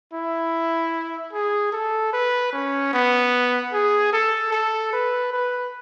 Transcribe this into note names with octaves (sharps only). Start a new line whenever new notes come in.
E4
G#4
A4
B4
C#4
B3
G#4
A4
A4
B4
B4